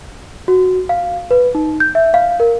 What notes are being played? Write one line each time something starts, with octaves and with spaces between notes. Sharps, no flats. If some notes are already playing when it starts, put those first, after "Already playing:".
F#4
F5
B4
D#4
G6
E5
F5
A#4